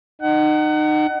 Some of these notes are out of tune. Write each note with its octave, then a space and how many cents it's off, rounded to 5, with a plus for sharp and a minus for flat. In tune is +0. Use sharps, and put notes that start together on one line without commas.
D#4 -30 F#5 +25